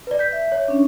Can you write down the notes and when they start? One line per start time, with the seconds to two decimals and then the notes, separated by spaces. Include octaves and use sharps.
0.07 B4 D5
0.19 G6 B6
0.32 E5
0.52 C#5
0.68 C#4 D4